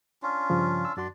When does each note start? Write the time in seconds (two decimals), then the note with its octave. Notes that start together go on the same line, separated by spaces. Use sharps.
0.23 C#4 D4 F4
0.50 G2 C#3 F3
0.85 E6
0.97 F#2 D4 F#4 D5 C6